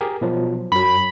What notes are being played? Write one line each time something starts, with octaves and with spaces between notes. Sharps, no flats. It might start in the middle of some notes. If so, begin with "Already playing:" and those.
G4 G#4 A#4
B2 F3 F#3
F#2 F#3 B5